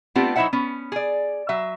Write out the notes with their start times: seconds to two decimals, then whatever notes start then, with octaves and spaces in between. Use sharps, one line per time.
0.15 A3 B3 C4 D4 F4 G4
0.36 F#3 D#4 E4 C5 E5 F#5
0.53 B3 C#4
0.92 G#4 D5
1.49 F#3 E5